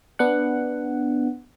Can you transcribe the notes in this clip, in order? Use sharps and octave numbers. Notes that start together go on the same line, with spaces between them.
B3 D4 F#5